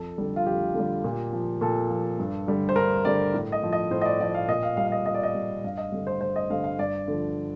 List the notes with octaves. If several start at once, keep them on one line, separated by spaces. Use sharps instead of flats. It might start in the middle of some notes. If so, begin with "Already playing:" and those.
Already playing: F2 A4
D3 G3
F4
F2 G4
D3 G3
A#2
F3
A#2 A4
F3
G2
D3 G3
C5
G2 A#4
D3 G3 D5
A2
D#5
F3
D#5
A2 C5
D#5
D5
F3 D5
F5
A#2 D#5
F5
G3 F5
F5
D#5
A#2 D#5
D5
D#5
G3
G2 F5
D#5
D3 G3
C5
G2 C5
D#5
D3 G3 F5
F5
G2 D5
D3 F3